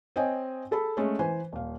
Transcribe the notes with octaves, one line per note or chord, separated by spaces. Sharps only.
C4 C#5 D#5 G5 G#5
G#4 A4 A5 B5
G#3 A3 C#4
E3 B4 C5 G#5
D#1 F5